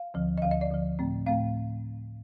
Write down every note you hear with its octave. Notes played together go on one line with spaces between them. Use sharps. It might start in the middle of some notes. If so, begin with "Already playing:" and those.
Already playing: F5
D2 D3 F3
D#5
D2 D3 F3 F5
D#5
D5
D2 D3 F3
A2 A3 C4
A2 A3 C4 F5